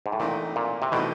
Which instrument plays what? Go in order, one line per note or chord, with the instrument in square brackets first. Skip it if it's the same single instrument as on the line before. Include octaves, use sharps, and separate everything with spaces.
[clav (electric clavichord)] G#2
A2
[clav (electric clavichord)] A#2 [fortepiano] E3 A3 C4 D#4
[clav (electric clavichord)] A#2
C3
[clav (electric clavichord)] B2 [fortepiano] E3 A3 C4 D#4